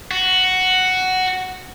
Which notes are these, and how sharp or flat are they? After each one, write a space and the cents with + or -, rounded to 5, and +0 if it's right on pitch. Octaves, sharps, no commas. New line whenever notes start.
F#4 +5